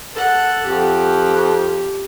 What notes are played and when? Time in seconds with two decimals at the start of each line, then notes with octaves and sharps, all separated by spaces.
0.14 A4 F#5
0.64 F2 G4